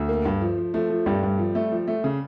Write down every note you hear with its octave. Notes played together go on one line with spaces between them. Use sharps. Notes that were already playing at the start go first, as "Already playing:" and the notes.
Already playing: D2 A3
A#3
G2
F3
F3
F3 A3
F3
G2 G3
G2
F3
A3
F3
A3
C#3